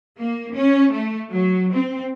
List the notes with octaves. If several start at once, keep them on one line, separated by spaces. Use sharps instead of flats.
A#3
C#4
A3
F#3
C4